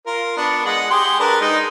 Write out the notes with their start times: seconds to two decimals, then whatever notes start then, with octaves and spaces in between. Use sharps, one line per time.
0.07 F4 A#4
0.37 B3 D4
0.66 G#3 F#5
0.91 G4 G#4 C6
1.20 D4 A#4 B4
1.41 G#3 D#4